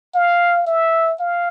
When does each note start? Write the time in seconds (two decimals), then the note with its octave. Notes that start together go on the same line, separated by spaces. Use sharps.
0.15 F5
0.66 E5
1.20 F5